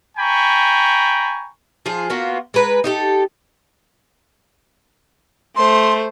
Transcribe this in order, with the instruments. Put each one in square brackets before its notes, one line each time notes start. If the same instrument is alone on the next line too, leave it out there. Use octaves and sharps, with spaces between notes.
[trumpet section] G5 G#5 A#5 B5 C#6
[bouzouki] F3 F4 G#4
A#3 B3 F4 F#4
G#3 A#4 B4
D#4 G4 A4
[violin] A3 C5 [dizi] C6